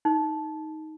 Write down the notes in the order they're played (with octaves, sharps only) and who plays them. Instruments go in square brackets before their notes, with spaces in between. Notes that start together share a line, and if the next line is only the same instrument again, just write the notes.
[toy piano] D#4